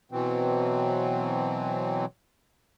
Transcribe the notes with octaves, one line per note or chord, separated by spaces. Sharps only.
B2 E3 F#3 C4